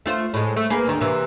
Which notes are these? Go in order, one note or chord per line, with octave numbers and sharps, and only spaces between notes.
A3 F4 C5
A2 G#3
A3
A#3 G#4 B4
D2 D#3
C3 E3 A#3